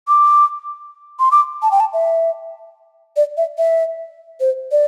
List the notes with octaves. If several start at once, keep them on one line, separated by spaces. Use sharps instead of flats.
D6
C6
D6
A5
G5
A5
E5
D5
E5
E5
C5
D5